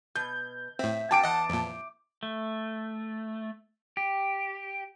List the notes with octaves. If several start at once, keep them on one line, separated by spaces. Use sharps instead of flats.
B2 G6
A2 C4 E5
B2 C#4 G5 A5 D6 D7
E2 D#5 F#5
F2 A#2
A3
G4